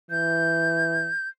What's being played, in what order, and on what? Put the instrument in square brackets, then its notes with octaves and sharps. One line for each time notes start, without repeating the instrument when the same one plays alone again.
[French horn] E3 [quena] G6